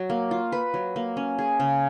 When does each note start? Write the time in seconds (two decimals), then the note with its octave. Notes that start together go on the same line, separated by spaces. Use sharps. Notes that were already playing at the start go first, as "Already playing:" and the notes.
Already playing: F#3
0.10 A#3
0.31 F4
0.52 B4
0.74 F#3
0.96 A#3
1.17 C#4
1.39 G#4
1.60 C#3